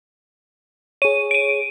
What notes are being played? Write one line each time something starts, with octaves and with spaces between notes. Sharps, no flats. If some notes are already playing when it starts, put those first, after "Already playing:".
G#4 C#5 D#7
D7 D#7